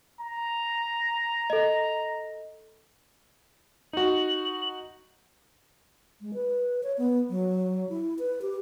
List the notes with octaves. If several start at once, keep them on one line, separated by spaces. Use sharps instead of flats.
A#5
A4 D#5
D#4 F#4 F#7
G#3
B4
C#5
B3
F#3
E4
B4
G4